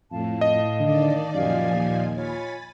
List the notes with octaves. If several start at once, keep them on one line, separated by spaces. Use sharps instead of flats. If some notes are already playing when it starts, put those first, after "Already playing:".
F2 A2 F5 A5
D#5
D3 D#3 D5
F#2 A#2 F3 G4 D5 F5 G#5
D#2
F4 C#5 G#5 B5 A6